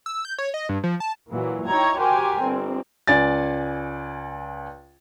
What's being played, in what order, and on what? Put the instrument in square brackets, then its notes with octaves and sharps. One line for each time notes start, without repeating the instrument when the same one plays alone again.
[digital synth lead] E6
G6
C#5
D#5
G2
F3
A5
[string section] A#2 E3 F#3 A#3
D#4 E4 C#5 G5 A#5 G#6
F#4 G4 A#4 C5 G5 G#5
G1 C4
[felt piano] C#2 D5 G#5 A6